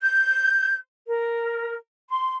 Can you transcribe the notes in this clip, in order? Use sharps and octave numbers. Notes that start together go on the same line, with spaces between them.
G6
A#4
C6